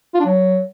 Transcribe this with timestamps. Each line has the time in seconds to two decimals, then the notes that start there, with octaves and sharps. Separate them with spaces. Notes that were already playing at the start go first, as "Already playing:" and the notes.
0.14 F4
0.20 D4
0.26 F#3